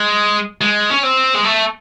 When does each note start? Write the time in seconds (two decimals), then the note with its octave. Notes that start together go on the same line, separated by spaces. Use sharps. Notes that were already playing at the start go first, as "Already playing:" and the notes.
Already playing: G#3
0.61 G#3
0.91 C#4
1.03 C4
1.34 G#3
1.44 A3